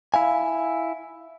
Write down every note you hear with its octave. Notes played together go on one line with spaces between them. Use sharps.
E4 F5 G#5